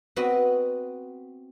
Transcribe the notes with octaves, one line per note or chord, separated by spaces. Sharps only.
B3 C4 F#4 D#5